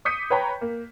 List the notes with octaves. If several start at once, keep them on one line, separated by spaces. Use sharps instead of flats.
D6 D#6 G6 B6 C#7 D#7
B4 C#5 G5 A#5 B5
A#3